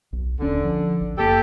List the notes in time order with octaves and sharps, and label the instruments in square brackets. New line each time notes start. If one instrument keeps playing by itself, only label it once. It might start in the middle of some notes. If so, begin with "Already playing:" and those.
[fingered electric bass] B1
[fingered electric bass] D#1 C#4 [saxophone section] D3
[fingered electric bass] F3
G#1
[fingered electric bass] F#1 A#3 [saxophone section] G4 A4